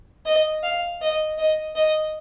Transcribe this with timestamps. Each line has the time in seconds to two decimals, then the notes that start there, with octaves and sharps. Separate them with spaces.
0.26 D#5
0.63 F5
1.01 D#5
1.38 D#5
1.75 D#5